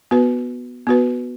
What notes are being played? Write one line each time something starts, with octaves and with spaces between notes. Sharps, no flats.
B3 F#4 B4
B3 F#4 B4